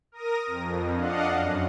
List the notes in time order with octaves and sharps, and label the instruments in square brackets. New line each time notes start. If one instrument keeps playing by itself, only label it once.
[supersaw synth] A#4 D#6 A#6
F2
D4 D#5 F5 F#5
F#2